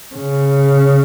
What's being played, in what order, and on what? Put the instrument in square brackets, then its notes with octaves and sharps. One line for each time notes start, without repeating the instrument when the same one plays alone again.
[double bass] C#3